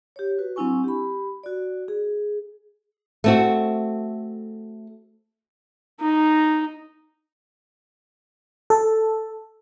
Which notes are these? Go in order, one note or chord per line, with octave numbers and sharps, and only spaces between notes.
G4 C#5
F#4 B4
F#3 C4 D4 E4 G#5 C#6
G4 B5
F#4 D5
G#4
A3 C4 F#4
D#4
A4